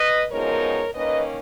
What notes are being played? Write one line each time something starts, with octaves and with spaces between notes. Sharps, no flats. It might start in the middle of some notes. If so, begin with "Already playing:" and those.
Already playing: B4 D#5
F#2 F3 G#3 B3 D#4 A#4 C#5
D#3 A#3 C#4 B4 D#5